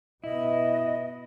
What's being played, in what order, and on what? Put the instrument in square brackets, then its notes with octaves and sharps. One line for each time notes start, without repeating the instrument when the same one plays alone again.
[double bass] B2 B3 [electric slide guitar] E4 [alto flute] D#5